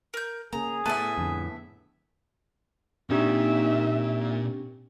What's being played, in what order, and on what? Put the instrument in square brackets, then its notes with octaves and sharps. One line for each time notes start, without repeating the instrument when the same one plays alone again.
[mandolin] A#4 G6
[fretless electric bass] C#3 A#3 [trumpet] G#4 [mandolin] A#5
[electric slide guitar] A2 B3 A5 [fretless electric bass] A3 [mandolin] B4 D5 E5
[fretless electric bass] F2 D3
[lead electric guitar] A#2 [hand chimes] C4 D4 G4 [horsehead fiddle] D#4 E5